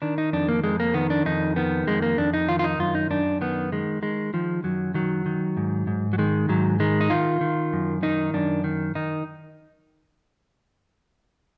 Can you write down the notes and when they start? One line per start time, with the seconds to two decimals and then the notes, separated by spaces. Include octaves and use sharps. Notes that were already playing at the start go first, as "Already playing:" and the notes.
0.02 D#3 D4
0.18 D#4
0.33 F2 D4
0.49 A#3
0.64 F2 G#3
0.80 A#3
0.94 D#3 B3
1.10 D4
1.26 F2 D#4
1.56 D#3 B3
1.87 F2 G#3
2.02 A#3
2.18 F2 D4
2.34 D#4
2.49 D#3 F4
2.59 F4
2.64 D#4
2.79 F#2 F4
2.95 D#4
3.10 F#2 D4
3.41 D#3 B3
3.72 D#3 G#3
4.02 D#3 G#3
4.33 D#3 F3
4.64 F#2 F#3
4.94 D#3 F#3
5.26 D#3
5.57 G#2
5.87 G#2
6.13 F#3
6.18 D#3 G#3
6.49 G#2 F#3
6.80 D#3 G#3
7.01 D#4
7.10 D#3 F4
7.41 D#3
7.73 F#2
8.03 D#3 D#4
8.34 F#2 D4
8.64 D#3
8.95 D#3 D#4